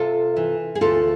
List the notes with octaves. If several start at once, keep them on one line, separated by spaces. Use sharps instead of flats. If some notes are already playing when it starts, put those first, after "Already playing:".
Already playing: C3 F4 A4
E3
G#4
D2 F4 A4